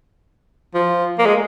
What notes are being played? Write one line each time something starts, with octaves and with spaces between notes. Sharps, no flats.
F3
A#3
G#3